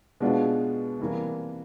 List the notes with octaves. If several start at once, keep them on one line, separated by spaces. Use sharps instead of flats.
B2 G#3 B3 D4 F4
C3 E3 G3 A#3